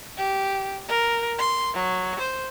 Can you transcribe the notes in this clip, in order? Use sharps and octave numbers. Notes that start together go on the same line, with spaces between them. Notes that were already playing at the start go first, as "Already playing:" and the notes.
G4
A#4
C6
F#3
C5